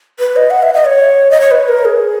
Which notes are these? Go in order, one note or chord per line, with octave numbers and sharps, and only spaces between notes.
B4
D#5
F#5
E5
D#5
C#5
D#5
C#5
B4
A#4
G#4